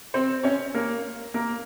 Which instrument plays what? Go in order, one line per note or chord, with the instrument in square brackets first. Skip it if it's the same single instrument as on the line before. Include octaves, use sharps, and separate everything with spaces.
[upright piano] C4 C5
C#4 C#5
A#3 A#4
A#3 A#4